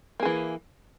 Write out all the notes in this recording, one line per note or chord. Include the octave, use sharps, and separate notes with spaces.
E3 A#3 G#4